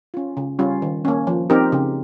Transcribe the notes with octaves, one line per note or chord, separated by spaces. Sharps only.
C#4 F4
C#3
G3 C#4 F4
D#3
A#3 C#4
F3
C4 D#4 G4 A#4
C#3